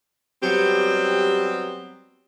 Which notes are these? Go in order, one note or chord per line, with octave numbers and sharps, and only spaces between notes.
F#3 G3 B3 C4 G4